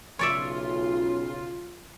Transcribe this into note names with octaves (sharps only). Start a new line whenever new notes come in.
B1 C#3 F4 C#5 D5 E5